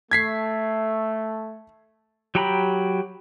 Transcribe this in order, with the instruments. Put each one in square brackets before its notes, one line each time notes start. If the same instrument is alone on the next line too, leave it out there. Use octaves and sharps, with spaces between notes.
[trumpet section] A3 [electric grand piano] G#6 B6 C7
[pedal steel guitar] F#3 G4 G5 A#5 B5